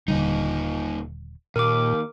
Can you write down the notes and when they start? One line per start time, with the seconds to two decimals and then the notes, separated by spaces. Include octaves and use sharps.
0.08 D#1 A#2 D3 G3 D#4
1.56 D#2 A#2 A#4 D6